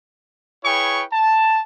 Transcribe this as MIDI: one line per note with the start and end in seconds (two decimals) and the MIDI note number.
0.64 1.03 64
0.64 1.03 68
0.64 1.03 71
0.64 1.03 73
0.64 1.03 79
0.64 1.03 85
1.12 1.60 81